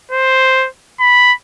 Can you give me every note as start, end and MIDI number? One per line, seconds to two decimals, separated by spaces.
0.11 0.68 72
1.00 1.33 83